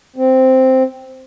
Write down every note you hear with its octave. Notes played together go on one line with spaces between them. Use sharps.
C4